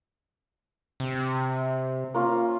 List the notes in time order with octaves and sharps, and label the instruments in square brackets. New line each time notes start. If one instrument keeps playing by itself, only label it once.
[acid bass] C3
[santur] A#3 C#4 F4